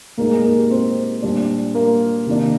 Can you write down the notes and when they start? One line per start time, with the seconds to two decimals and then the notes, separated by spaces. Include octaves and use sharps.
0.18 A#2 G#3 A#3 D#4 A#4
0.30 G#4
0.44 A#3 A#4
0.58 G4
0.70 C4 C5
1.22 A#2 G3 D4
1.75 A#3 A#4
2.27 C3 D#3 A#3 D4